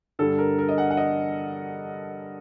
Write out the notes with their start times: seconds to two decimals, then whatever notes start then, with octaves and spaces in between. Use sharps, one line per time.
0.19 G2 D3 G3 A4
0.38 A#4
0.58 A#4
0.69 D#5
0.78 F#5
0.91 F#5
0.97 D#5